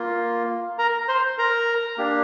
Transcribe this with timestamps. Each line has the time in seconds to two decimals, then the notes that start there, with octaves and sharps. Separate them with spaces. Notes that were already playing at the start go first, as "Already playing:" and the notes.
Already playing: A#3 F4
0.78 A#4 A#5
1.08 C5 C6
1.38 A#4 A#5
1.98 A#3 D4 G4